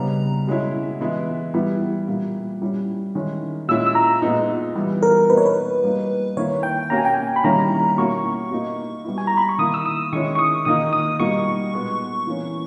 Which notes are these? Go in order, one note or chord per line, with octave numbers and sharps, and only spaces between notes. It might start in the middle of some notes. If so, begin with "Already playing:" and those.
Already playing: C#3 G3 B3 D#4 A#5
B2 G#3 C#4 E4
E3 G#3 B3 E4
E3 G3 B3 E4
A#2 G3 A#3 E4
G3 C#4 E4
D#3 G#3 C#4 E4
A#2 G#3 C#4 E4 E6
E6
A#5
A#2 G#3 B3 D#4
E3 G3 B3 E4
A#4
B2 A#3 D#4 B4
C#5
B4
G3 A#3 D#4
D#3 A#3 E4 C#5
G5
B2 A#3 C#4 A#5
G#5
G5
G#5
B5
D#3 G3 A#3 C#4 E4 A#5
B2 A#3 C#4 E4 C#6
B2 A#3 D#4
G3 B3 E4
G#5
A#5
B5
C#6
D#3 A#3 E4 D#6
E6
D#6
D#3 G#3 C#4 E4 C#6
C#6
D#6
D#3 A#3 D#4 D#6
D#6
B2 G3 A#3 D#4 C#6
A#2 G#3 B3
E3 A#3 C#4